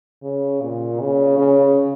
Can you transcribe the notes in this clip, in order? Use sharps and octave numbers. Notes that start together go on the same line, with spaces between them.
C#3
A#2
C#3
C#3